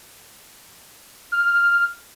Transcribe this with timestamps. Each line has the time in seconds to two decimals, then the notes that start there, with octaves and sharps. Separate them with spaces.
1.32 F6